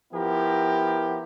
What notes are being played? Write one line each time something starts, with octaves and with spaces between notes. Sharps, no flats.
F3 B3 E4 G4 A#4